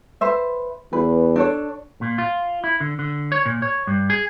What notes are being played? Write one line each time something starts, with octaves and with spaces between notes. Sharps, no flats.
B4 C5 E5
E2 B4
D4 A4 C#5
A#2
F4
E4
D3
D3
C#5
A#2
C#5
G2
G#4